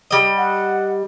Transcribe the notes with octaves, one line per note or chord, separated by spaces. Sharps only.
G3 D#5
F#5